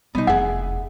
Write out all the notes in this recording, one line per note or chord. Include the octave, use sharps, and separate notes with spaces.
C3 G3 B3 D#4
F1 E2 G#4 E5 F#5